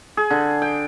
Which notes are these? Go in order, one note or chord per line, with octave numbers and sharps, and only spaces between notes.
G#4
D3
G5